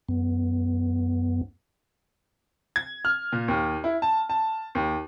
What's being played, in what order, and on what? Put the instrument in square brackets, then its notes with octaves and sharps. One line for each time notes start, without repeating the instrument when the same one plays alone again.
[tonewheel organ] F#2 B3
[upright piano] G#6
F6
A#2
D#2
E4
A5
A5
D#2